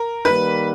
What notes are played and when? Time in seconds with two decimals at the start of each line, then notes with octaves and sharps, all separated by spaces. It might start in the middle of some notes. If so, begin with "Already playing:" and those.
Already playing: A#4
0.25 D#3 G3 A#3 B4